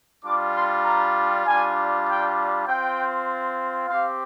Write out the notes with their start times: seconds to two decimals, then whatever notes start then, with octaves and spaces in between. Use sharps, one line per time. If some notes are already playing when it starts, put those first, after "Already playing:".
0.24 G3 D4 F4 D6
0.55 C6
0.85 A#5
1.45 G3 D4 F4 G#5
2.06 G5
2.66 C4 F4 G5
3.87 C4 G4 F5